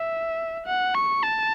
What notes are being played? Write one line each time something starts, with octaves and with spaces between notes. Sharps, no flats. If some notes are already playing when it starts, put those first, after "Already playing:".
Already playing: E5
F#5
C#6
A5